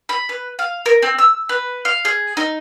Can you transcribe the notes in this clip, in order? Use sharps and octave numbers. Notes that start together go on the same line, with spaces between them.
B5
B4
F5
A#4
C4
E6
B4
F5
G#4
D#4